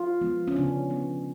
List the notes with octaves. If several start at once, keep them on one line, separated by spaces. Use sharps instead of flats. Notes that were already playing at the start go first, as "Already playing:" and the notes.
Already playing: F4
F3 G#3 B3
C#4
C#3 F3 B3 D4
F3 B3